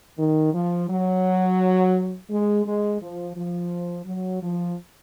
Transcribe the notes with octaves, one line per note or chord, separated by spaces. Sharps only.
D#3
F3
F#3
G#3
G#3
F3
F3
F#3
F3